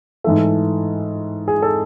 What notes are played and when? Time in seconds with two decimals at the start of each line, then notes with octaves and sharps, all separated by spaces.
0.24 G#2 E3 A3 E5
1.48 G#4
1.62 A4